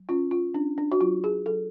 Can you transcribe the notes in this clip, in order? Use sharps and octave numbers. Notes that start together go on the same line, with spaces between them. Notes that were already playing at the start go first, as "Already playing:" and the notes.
Already playing: F#3
C#4 F4
F4
C#4 D4
D4
F#4
F#3 F4
G#4
F#3 A4